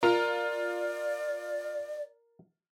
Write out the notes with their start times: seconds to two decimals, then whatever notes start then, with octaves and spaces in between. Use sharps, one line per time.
0.03 F4 A#4 D5